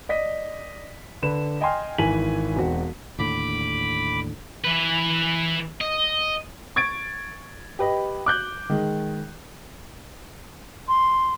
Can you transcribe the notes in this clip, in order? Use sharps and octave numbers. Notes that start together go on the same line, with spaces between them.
D5 D#5 B6
D3 B4 E7
D#5 G5 G#5 C6 F6
G#1 E3 G#5 B6 D#7 F#7
E1 C4 F#4
D#2 A2 D3 B5 D6
E3 B4
D#5
C#6 G#6 A6 D7
G4 B4 D#5
D6 F#6 G6
D#3 G#3
C6